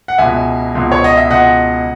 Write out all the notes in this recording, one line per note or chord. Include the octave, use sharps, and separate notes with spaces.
F#5
C#2 B2 E5 G#5
C#2 B2
C#5
D#5
E5
C#2 B2 D#5 F#5